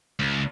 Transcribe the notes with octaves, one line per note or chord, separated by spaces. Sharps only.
C#2